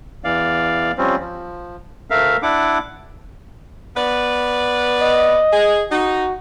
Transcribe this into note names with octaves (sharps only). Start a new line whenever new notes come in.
E2 E3 D5 F5
F3 G3 C4 C#4
F3
D2 A3 A#4 E5 F5
D4 E4 F#5 D6
B3 B4 D5
D#5
G#4
D#4 F#4